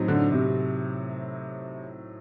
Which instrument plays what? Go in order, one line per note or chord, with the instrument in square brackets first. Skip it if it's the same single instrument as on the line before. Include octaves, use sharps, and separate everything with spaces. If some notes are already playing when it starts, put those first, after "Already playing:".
Already playing: [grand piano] A2 F#3 C4 D#4
[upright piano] D3
C3